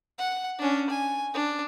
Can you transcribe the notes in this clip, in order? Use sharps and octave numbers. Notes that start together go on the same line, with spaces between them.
F#5
C#4 D4
G#5
D4